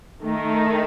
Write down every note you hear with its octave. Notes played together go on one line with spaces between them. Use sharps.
D#3 A3 D#4